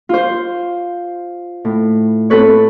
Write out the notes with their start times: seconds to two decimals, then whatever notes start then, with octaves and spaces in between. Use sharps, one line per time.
0.09 F4 C5
1.65 A2
2.30 C4 A4 B4 C#5